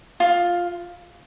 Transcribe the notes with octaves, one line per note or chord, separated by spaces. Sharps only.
F4